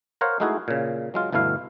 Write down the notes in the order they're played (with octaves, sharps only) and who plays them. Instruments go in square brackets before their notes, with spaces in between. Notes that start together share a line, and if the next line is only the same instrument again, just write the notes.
[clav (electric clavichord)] A#4 C5 C#5 F5 F#5
G#3 A3 D#4 E4 F#4 G#4
A#2 C#3
F#3 G#3 F4
G1 B2 A3 E4 F5